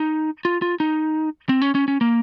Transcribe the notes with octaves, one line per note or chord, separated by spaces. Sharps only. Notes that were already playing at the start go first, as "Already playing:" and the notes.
Already playing: D#4
F4
F4
D#4
C4
C#4
C#4
C#4
A#3